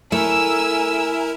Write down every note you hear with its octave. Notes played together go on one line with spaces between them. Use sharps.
A3 E4 A#4 G#5 E6